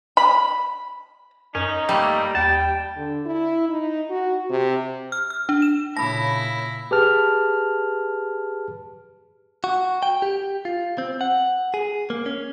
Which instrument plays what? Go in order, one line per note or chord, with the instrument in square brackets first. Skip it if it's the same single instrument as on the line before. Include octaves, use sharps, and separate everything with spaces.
[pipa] B5
[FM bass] F#2 [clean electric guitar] C#4 [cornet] D#4
[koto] G3 [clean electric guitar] A3 A#3
[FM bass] D#2 [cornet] G5 [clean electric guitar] A5
[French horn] D3
E4
D#4
F#4
C3
[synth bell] F6
F6
D4
E7
[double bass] A#2 C#3 [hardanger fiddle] E4 [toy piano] A5 B5 [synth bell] A#6
[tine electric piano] G4 G#4 B4 A5 F6
[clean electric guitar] F#4
G5
G4
F4
C4
F#5
G#4
A#3
C#4